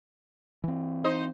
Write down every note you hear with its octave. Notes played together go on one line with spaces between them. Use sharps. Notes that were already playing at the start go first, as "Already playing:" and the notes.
E3 C4
D#4 C5 D#5